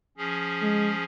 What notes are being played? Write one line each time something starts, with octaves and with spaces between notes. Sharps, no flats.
F3 C#4 G#4
G#3